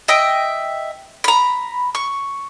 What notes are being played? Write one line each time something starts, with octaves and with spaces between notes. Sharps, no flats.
D#5 E5 G5
A#5 B5
C#6